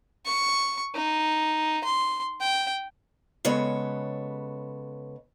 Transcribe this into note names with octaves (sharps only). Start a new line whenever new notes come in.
C#6
D#4
C6
G5
C#3 G#3 B3 A4 C#5